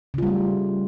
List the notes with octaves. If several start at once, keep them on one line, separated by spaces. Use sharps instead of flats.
C#3 G3 A3 F4